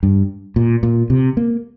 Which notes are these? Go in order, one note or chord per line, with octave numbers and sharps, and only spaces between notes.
G2
A#2
A#2
C3
A#3